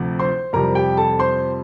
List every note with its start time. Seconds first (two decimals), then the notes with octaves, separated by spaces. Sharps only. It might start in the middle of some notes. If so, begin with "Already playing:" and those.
Already playing: D2 C3 F3 A3
0.19 C5 C6
0.53 F2 C3 G3 A#4 A#5
0.75 G4 G5
0.97 A4 A5
1.19 C5 C6